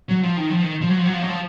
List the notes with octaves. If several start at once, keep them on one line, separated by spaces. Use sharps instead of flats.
F#3
F3
D#3
F3
D#3
F3
F#3
F3
F#3
F3
F#3
F3